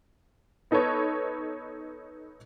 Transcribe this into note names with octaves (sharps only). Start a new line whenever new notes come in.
B3 D#4 A4 B4 C#5